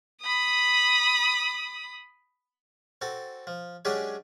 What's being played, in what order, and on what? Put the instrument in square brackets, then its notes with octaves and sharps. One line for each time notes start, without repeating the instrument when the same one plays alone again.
[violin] B5 D#6
[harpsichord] C4 F#4 A4
F3
F#3 G#3 C#4 D4 G4 G#4